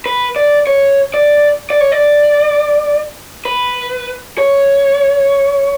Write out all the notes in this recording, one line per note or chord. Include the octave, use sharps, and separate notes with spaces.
B4
D5
C#5
D5
D5
C#5
D5
B4
C#5